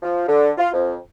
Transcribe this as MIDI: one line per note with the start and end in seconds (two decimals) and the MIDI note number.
0.02 0.25 53
0.28 0.50 50
0.58 0.69 65
0.73 0.96 41